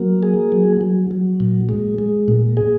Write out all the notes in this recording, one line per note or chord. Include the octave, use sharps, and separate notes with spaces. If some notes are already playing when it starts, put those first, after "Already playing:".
Already playing: F#3 A#3
G#4
F#3
F#3
F#3
A#2
G#3
G#3
A#2
G#4